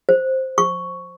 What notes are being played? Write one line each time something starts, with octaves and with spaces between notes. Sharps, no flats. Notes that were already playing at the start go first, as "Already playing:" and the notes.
C5
C#6